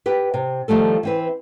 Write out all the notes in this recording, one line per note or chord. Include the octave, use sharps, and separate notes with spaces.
G4 B4 G5
C3
D#3 F3 G3 A3 A4
E3 C4 B4